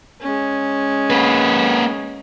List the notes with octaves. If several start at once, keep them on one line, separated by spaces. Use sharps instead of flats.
G#3 C#4
A#3 B4